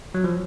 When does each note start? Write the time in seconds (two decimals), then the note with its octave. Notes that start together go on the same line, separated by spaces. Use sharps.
0.14 F#3
0.24 F3